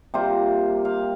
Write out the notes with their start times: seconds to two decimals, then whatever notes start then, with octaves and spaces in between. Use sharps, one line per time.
0.14 C3 G3 A#3 F4 C5
0.85 F5